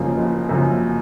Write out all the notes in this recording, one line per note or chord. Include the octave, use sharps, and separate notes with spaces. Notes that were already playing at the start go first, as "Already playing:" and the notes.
Already playing: F#1 F#2 C#3 F3 A#3
F#1
F#2 C#3 F3 A#3